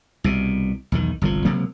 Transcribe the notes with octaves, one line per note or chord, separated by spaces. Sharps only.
C2 B2
B1 E2 D#3
G1 C2 C3 F3
C#2 C3 F#3 A#3